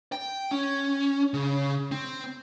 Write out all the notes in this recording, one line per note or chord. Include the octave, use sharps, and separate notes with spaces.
G5
C#4
C#3
C4